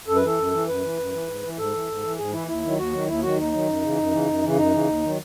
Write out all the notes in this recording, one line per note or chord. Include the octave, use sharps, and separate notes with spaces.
F#2 A4
B4
E3 A4
F#2
E3
F#2 B4
E3
F#2
E3
G#2
E3
G#2 A4
E3
G#2
E3
G#2 G#4
E3 E4
D#2 E4
D#3 F#3
D#2 F#4
D#3 F#3
D#2 E4
D#3 F#3 F#4
D#2 D#4
D#3 F#3
F#2
C#3 E3
F#2
C#3 E3
F#2
C#3 E3
F#2 D#4
C#3 E3
D#2
D#3 F#3